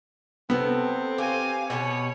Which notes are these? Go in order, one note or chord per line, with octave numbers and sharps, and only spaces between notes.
C3 B3 C4 A4
C#4 G4 F5 G#5
B2 G4 B4 C#5